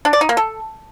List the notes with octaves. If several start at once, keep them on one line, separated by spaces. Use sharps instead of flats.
D4
D5
D#4
A#3
A4